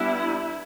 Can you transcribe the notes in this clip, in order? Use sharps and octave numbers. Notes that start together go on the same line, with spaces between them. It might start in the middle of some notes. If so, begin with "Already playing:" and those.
Already playing: G3 B3 D4 E4